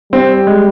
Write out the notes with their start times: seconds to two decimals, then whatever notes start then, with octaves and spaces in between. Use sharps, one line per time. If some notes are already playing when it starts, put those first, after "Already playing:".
0.12 G3 C4
0.47 G#3